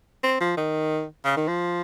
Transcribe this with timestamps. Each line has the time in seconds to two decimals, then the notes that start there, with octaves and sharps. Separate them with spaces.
0.24 C4
0.41 F3
0.57 D#3
1.25 C#3
1.37 D#3
1.48 F3